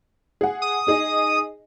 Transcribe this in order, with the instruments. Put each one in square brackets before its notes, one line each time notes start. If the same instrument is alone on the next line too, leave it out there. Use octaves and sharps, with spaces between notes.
[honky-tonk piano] G#4 F#5
[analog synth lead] D#6
[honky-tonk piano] D#4 G#4 D#5